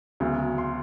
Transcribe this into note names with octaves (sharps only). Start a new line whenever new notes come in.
D2 C#3 F#3 B3
C6